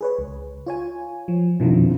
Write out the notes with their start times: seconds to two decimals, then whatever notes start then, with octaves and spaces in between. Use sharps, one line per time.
0.01 G#4 B4 C#5
0.19 C#2
0.66 F4 C#5 G#5
1.28 F3
1.60 E1 C2 F2 B2 D#3 F3